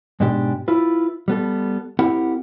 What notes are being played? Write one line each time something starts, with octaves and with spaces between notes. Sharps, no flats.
G#2 B2 G#3 D4 G4
E4 F4 B4
G3 B3 A4
C4 E4 G4 A#4 F#5